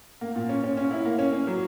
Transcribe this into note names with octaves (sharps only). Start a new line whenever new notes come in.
A#3
A#2
C#4
C#4
C#4
E4
A#3
C#4
C#4
F#3